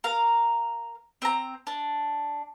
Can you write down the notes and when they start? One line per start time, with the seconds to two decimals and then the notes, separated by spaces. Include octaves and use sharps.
0.04 A#4 F5 A#5
1.22 C4 A#5
1.67 D4